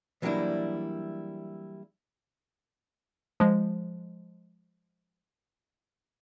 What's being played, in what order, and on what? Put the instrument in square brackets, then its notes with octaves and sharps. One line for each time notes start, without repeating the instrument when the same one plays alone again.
[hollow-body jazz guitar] E3 F#3 G3 A#3 D4 E4
[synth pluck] F3 G#3